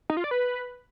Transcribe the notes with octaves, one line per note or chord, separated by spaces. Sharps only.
D#4
F4
D5
B4